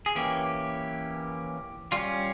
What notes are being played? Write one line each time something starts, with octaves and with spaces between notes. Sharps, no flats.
G#4
E3 A#3 C#4 G4
G3 C#4 F4